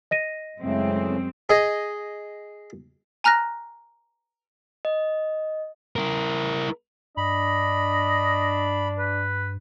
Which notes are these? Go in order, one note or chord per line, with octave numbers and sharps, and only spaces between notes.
D#5 A#6 D#7
F#2 C#3 E3 G#3 A3 C4
G#4 D#5
G#5 A#5 F6 F#6 A#6
D#5
E4 A#4
G2 D4 D#5 B5
B4